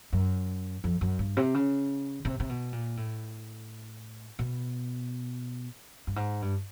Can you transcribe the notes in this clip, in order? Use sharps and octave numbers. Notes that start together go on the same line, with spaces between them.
F#2
F2
F#2
G2
C3
C#3
C3
C3
B2
A#2
A2
B2
G2
G#2
G2